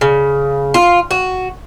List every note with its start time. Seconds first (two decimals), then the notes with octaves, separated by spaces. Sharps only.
0.01 C#3
0.74 F4
1.11 F#4